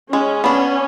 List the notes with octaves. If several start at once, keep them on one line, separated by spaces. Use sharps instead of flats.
G#3 C#4
B3 D4